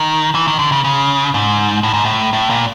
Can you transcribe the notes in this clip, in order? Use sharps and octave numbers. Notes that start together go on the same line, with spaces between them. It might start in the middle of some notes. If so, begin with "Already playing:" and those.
Already playing: D#3
E3
D#3
D3
C#3
C#3
G#2
A2
G#2
A2
A2
A#2